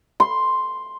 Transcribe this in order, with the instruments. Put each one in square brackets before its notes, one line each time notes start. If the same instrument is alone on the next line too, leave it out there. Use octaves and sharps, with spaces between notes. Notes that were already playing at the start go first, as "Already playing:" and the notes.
[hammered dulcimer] C6